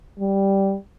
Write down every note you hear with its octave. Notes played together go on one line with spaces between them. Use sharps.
G3